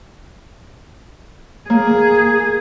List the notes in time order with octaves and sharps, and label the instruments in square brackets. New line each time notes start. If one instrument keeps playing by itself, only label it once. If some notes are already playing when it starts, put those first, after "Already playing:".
[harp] A#3 [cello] G#4